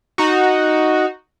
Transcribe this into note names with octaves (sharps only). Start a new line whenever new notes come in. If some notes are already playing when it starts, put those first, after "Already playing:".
D#4 F#4